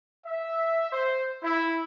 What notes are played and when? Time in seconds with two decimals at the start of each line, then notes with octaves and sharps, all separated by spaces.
0.26 E5
0.92 C5
1.44 E4